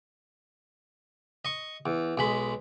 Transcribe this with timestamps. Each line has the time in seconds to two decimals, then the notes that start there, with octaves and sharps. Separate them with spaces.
1.45 D#5 C#6
1.86 E2
2.18 B1 G#3 B5